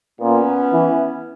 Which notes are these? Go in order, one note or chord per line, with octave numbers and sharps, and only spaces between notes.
A#2 B3 C#4
E3